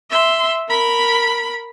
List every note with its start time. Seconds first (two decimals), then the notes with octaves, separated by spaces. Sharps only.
0.10 E5 C6
0.69 A#4 B5